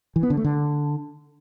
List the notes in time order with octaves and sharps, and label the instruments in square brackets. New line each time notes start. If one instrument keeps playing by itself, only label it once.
[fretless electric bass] E3
B3
D3
A3
D3